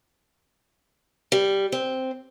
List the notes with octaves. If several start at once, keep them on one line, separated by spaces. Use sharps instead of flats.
G3
C4